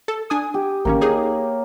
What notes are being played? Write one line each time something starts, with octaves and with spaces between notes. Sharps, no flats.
A4
D4 G#5 D#6
G4
A1 D#3 A#3 C#4 A#4 C#5
D#4 G#4